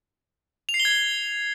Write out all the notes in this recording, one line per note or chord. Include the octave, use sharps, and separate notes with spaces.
F7
C7
G7
G#6
G7